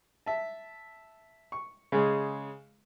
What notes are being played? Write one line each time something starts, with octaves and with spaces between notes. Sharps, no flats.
E5 A5
C#6
C#3 G#3